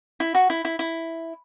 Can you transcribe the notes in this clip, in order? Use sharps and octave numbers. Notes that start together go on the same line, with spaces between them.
E4
F#4
E4
E4
E4